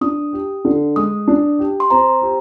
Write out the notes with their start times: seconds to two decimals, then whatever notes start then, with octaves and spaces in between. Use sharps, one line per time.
0.01 D4 D#6
0.33 G4
0.65 D3
0.96 G#3 D#6
1.28 D4
1.59 G4
1.80 C6
1.90 C4 A#5
2.22 G4